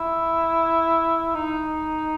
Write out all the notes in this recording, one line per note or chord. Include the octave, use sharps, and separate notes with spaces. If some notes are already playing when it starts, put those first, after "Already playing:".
Already playing: E4
D#4